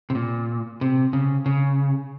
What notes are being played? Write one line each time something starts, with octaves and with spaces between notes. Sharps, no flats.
C3
A#2
C3
C#3
C#3